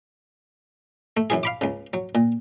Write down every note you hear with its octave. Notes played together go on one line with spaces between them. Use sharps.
A3
F#2 E3 G#4
F5 B5 D6
C#2 C#3
F#3
A#2